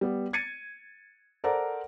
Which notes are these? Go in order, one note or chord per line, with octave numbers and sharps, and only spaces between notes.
G3 B3
G#6 A6 C#7 D#7
A4 A#4 C5 D5 F#5 A#5